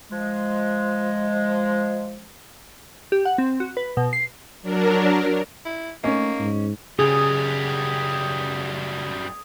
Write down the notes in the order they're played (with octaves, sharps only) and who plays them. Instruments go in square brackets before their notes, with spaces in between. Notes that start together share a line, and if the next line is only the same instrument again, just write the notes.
[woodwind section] F3 G#3
[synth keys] G4
F#5
C4
F#4
B4
B2
C7
[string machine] F#3 D4 A#4
[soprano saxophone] E4
[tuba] A3 [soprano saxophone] A#3 [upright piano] C#4 D#4
[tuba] G#2
[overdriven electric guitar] F#2 G3 [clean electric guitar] C#3 [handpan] G#4 [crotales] D#6 G#6